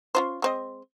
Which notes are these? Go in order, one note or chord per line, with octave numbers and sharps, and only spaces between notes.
C#4 F4 C5
G#3 C4 D#5